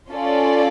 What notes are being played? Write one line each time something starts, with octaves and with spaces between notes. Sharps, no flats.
C#4 F4 A4 D5